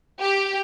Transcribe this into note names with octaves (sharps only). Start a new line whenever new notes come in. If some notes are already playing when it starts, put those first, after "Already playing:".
G4